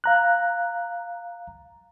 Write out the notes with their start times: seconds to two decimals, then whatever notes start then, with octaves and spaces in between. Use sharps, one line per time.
0.04 F5 A#5 F#6